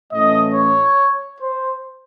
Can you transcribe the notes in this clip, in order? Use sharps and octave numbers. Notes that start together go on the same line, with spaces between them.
A2 E3 A3 C#4 D#5
C#5
C5